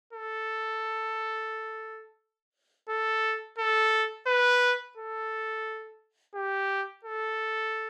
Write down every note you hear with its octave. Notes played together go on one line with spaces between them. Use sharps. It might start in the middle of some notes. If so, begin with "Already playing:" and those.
A4
A4
A4
B4
A4
G4
A4